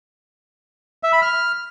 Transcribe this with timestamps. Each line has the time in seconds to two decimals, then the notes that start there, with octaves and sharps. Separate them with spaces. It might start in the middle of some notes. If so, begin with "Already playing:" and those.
1.03 E5
1.13 B5
1.22 F6